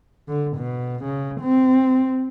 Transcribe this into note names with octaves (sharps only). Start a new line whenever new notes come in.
D3
B2
C#3
C4